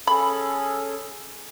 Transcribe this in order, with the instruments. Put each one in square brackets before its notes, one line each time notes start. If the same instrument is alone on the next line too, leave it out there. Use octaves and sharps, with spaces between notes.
[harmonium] C#4 G#4 A4 [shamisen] B5